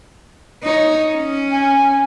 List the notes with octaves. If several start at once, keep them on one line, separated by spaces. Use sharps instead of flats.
D#4 C#5
C#4
G#5